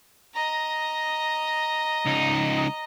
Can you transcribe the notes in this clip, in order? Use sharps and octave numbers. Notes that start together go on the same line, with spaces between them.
D#5 A#5
C#2 D#4